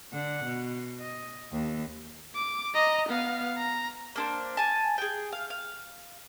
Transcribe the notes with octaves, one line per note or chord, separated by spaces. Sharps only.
D3 F#5
B2
D#5
D#2
D6
D#5 A#5
B3 F5
A#5
A#3 D4 C5
G#5 A5
G#4 G5
F5
F5